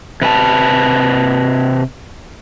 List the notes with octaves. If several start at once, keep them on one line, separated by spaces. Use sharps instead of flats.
C3 B4 G#5 A5